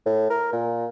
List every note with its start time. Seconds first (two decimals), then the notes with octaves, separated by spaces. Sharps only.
0.06 A2
0.30 A#4
0.53 A#2